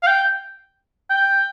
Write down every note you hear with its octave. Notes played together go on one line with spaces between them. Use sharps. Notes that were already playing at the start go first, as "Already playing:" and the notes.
F5
G5
G5